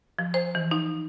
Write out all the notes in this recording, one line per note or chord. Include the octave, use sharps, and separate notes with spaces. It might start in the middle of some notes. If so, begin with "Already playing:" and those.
F3
C5
E3
D#4